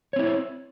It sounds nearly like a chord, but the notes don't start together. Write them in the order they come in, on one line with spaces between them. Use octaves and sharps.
C#5 C4 E4